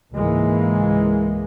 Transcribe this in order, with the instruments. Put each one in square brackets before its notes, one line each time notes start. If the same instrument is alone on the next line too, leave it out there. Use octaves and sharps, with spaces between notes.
[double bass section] C#2 G#2 E3 G#3 A#3